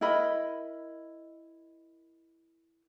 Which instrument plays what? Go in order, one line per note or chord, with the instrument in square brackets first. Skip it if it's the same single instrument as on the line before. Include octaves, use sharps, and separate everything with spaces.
[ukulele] E4 A#4 D#5 B5